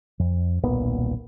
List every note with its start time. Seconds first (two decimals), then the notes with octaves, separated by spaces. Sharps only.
0.19 F2
0.63 D#1 B1 A#2 B3